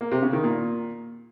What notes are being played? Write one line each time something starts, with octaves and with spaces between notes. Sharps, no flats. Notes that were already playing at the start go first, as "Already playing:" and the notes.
A#3
C3
C#3
D#3
A#2